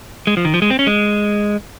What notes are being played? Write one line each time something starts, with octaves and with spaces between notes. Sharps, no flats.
G#3
F3
D#3
F3
G#3
C4
C#4
G#3